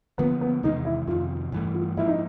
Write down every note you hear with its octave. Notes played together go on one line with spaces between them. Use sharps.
D3 F3 A#3 B3
B3
E2 C3 D#3 G#3 D#4
E4
F2 C3 D#3 F4
G2 E3 A3
F4
G#2 F3 A#3 E4
D#4